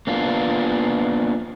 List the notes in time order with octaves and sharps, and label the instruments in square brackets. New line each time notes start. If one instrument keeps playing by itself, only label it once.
[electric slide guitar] A#3 B3 D4 F4